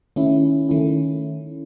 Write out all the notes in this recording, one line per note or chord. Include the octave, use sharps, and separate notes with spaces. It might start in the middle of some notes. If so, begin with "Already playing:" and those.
D#3 A3 C#4 E4
D#3 A3 C#4 E4